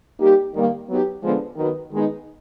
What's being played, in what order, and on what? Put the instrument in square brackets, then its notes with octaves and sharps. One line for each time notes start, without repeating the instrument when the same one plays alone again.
[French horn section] G3 A#3 D#4 G4
D#3 G3 A#3
F#3 B3 D#4 G4
D3 F3 G#3 B3
D#3 F#3 B3
D#3 G#3 B3 D#4